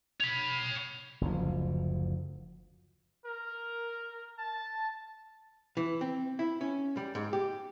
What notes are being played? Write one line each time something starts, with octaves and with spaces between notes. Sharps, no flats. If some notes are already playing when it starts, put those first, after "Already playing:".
C#5 B5 F7
F#1 D2 F3
A#4
A5
E3
C4
E4
C#4
G3
G#2
G4